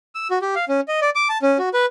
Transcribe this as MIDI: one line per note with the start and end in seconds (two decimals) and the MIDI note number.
0.15 0.28 88
0.31 0.39 66
0.42 0.55 67
0.55 0.65 77
0.68 0.81 61
0.88 1.00 75
1.01 1.10 74
1.15 1.28 86
1.29 1.38 81
1.42 1.58 61
1.58 1.69 66
1.74 1.86 71